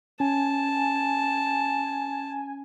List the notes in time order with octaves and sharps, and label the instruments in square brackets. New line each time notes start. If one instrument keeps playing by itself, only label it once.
[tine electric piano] C#4 [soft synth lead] G#5 [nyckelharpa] A5